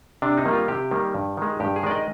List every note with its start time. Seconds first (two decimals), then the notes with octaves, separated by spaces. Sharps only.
0.22 C3 D4
0.38 D#4
0.45 D#3 G3 A#3
0.53 F4
0.68 C3 G4
0.91 D#3 G3 A#3
1.14 G2
1.37 D#3 G#3
1.60 G2 G4
1.76 G#4
1.83 D#3 G#3 D5
1.91 D#5